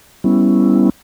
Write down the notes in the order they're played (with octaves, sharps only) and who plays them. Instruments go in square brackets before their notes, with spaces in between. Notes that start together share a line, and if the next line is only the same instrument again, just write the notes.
[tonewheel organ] G3 B3 C#4 E4